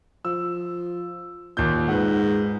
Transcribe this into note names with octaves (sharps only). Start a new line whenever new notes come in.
F3 E6
D#2 A#2 G6
G#2 B4 F#5